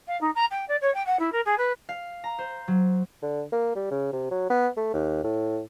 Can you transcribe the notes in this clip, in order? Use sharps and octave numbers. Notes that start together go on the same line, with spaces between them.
F5
D#4
A#5
G5
D5
C#5
G5
F#5
E4
A#4
G#4
B4
F5
A#5
C5
F#3
D3
A#3
G3
C#3
C3
F#3
B3
A3
D#2
A2